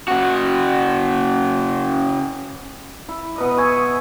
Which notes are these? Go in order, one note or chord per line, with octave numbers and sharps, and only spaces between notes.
C#3 F#4
E4
B2 B4 D#5
E5 G#5 C#6